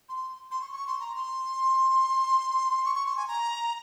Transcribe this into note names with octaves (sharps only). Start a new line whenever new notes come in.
C6
C6
C#6
C#6
C6
A#5
C6
C#6
C#6
C6
G#5
A#5